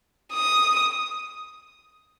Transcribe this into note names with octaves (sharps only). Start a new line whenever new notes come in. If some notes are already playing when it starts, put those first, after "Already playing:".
D#6